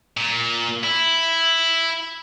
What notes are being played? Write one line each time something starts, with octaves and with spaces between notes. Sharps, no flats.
A#2
E4